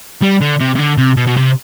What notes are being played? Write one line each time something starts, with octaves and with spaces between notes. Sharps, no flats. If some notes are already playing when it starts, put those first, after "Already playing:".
G3
D3
C3
C3
D3
C3
B2
B2
C3